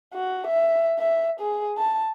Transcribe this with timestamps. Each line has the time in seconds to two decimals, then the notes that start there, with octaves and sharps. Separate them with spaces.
0.14 F#4
0.47 E5
0.99 E5
1.40 G#4
1.77 A5